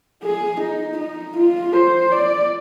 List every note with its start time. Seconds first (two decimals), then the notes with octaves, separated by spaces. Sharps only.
0.23 G#4
0.60 D#4
0.98 D#4
1.36 F4
1.74 C5
2.12 D5